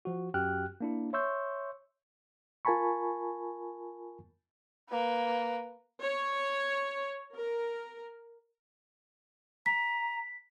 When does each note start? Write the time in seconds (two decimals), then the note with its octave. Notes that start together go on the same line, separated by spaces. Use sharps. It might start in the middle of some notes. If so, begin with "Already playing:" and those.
0.05 F3 F#4
0.34 F#2 F#4 G4 G5 F6 F#6
0.81 A#3 D4 E4
1.13 C#5 E5 C6 C#6 E6 G6
2.65 F4 A#4 G#5 A5 B5 C#6
4.90 A#3 B4
6.02 C#5
7.34 A#4
9.66 A#5 B6